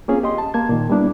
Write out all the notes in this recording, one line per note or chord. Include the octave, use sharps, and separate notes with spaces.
A#3 C4 C#4 F4 G#4
G4 D#5 C6
A5
A#3 A5 G#6
A#2 D#3
G3 A#3 B3 D4 E4